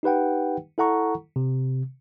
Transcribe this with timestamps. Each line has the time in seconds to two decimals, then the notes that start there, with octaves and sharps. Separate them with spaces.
0.03 D#4 G4 B4 F#5 G5
0.78 E4 A4 F#5 A#5 C#6
1.36 C3